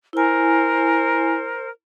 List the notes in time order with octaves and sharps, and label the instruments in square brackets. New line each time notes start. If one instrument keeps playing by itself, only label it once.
[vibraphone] E4 G#5 [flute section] A#4 C5